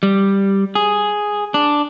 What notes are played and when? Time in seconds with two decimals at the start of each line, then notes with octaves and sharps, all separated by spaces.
0.03 G3
0.75 G#4
1.54 D4